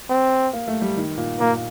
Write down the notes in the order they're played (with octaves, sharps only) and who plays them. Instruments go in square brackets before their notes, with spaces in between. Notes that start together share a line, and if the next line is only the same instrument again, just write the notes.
[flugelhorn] C4
[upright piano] A#3
A3
G3
D#3
A#2
[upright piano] A#2 [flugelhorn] A#3